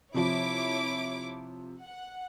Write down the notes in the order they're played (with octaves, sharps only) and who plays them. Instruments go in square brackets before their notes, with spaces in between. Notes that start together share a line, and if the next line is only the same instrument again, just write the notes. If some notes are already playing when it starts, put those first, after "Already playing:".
[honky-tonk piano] C3 F3 [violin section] E4 C#5 D6
[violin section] F#5